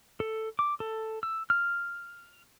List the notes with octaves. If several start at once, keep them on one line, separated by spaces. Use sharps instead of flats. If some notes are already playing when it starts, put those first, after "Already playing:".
A4
D6
A4
E6
F6